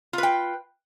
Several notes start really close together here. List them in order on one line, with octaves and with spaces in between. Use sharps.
F4 B4 G5